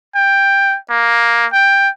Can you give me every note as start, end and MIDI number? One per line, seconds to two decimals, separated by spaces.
0.15 0.77 79
0.90 1.46 58
1.53 1.89 79